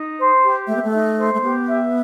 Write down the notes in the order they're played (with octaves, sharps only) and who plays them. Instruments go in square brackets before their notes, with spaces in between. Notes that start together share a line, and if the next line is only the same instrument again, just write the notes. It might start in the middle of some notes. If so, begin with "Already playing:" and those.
Already playing: [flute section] D#4
C5
G4
[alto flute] A3 [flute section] E5
[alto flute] B3
A3
[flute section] D#4
C5
[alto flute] A3
[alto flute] B3 [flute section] G4
[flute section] E5